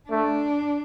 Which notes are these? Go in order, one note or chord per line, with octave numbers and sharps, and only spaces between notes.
A3 D4